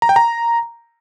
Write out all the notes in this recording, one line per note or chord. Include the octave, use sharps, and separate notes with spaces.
A#5
G5
A#5